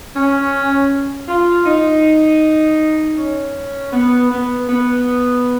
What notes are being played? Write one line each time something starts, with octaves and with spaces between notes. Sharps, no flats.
C#4
F4
D#4
C#4
B3
B3
B3